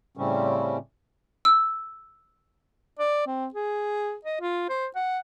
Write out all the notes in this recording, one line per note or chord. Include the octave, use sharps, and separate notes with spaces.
A2 C#3 G3 C4 C#4
E6
D5
C4
G#4
D#5
F4
C5
F#5